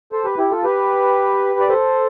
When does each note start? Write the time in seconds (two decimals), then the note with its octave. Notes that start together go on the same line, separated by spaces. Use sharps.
0.12 A4 C5
0.24 G4 B4
0.38 E4 G4
0.51 F4 A4
0.64 G4 B4
1.60 D5
1.69 A4 C5